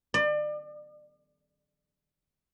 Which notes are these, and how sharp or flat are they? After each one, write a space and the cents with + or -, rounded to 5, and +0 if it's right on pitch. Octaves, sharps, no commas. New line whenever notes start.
D5 +35